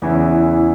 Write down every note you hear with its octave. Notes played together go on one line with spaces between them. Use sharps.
E2 C#3 E3 E4